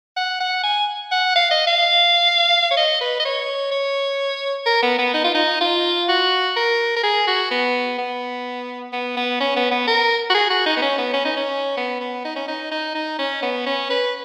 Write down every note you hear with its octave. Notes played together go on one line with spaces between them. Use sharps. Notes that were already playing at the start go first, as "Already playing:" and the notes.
F#5
F#5
G#5
F#5
F5
D#5
F5
C#5
D#5
B4
D#5
C#5
C#5
A#4
B3
B3
D#4
F4
D#4
F4
F#4
A#4
A#4
G#4
F#4
B3
B3
B3
B3
C#4
B3
B3
A#4
F#4
G#4
F#4
D#4
B3
C#4
B3
C#4
D#4
C#4
B3
B3
D#4
C#4
D#4
D#4
D#4
C#4
B3
C#4
B4